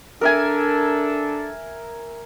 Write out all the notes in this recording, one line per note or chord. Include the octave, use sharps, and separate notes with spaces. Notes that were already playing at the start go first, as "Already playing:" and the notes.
D4 A4 A#4 E5 G#5